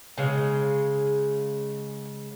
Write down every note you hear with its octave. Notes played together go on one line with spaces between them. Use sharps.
C#3 G#3